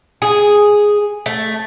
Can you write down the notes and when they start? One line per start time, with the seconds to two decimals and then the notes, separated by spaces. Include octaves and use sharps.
0.22 G#4
1.26 A3